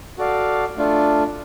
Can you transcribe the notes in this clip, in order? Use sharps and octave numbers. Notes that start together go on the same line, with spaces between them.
F#4 A4 D5 F5
A3 D4 F4 A4